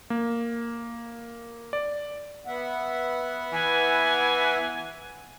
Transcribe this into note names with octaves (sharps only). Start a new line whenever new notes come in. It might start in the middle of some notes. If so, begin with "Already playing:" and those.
A#3
D5
B3 E5 F#5
E3 G#5